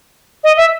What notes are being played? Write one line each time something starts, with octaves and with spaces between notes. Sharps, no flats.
D#5
E5